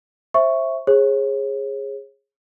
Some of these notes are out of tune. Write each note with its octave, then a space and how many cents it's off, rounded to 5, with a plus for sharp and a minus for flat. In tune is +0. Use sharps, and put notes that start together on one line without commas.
C5 +25 E5 +0 C#6 +0
G#4 -10 C#5 -35